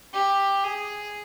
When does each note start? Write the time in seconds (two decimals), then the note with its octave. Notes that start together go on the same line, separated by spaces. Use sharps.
0.13 G4
0.64 G#4